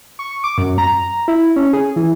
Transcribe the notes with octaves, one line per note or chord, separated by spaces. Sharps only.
C#6
D6
F#2
A#5
E4
C#4
G#4
E3